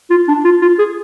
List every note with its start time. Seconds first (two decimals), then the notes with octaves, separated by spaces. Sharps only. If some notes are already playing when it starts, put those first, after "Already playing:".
0.10 F4
0.28 D4
0.44 F4
0.62 F4
0.78 G#4